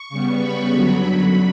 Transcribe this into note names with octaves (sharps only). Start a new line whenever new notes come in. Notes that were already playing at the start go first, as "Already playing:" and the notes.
Already playing: C#6
C#3 G3 B3
B5
F#2 D3 F#3